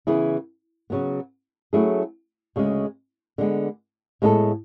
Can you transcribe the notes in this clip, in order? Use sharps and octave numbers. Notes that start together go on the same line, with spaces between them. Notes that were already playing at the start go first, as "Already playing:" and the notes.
C#3 E3 B3 E4 G#4
C#3 F#3 B3
F#3 A3 C#4 E4 G#4
D2 C#3 G#3
D3 G#3 B3
A2 G#3 B3 E4 A4